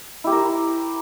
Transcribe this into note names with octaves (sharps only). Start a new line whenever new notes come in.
E4 G4 A#4 C5